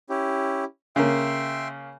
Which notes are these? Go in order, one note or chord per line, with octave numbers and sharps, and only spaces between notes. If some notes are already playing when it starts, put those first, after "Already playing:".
C#4 E4 G4
C#3 A#3 E5 G5 C6